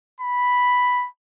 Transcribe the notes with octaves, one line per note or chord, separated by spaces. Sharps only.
B5